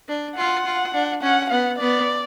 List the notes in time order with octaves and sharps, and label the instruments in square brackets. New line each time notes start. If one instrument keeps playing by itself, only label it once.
[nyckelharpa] D4
[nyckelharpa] F4 [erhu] F#5
[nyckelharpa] F4
D4
[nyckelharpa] C#4 [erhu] F#5
[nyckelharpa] B3 [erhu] F#5
[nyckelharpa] B3 [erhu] D5